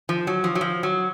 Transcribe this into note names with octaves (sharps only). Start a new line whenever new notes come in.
F3
F#3
F3
F#3
F3
F#3